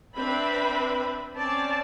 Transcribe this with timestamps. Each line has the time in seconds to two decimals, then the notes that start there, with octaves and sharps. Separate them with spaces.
0.15 C4 D4 B4 E5 B5
1.34 C4 C#4 D5 A5